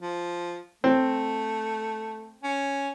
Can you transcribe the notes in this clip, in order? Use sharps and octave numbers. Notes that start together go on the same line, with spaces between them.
F3
A3 C4
C#4